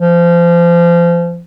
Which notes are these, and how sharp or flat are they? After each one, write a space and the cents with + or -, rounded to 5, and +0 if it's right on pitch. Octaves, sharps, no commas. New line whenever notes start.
F3 -30